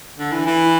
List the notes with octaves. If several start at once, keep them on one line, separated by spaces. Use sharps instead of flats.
D3
E3
E3